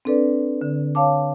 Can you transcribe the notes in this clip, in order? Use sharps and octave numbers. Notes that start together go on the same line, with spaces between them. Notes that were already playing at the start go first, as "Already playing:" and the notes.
C4 D4 A4 B4 D5
D3
C#5 F5 A5 D6